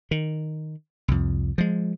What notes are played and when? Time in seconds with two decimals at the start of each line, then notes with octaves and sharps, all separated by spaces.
0.11 D#3
1.08 C2 F2
1.58 F3 G#3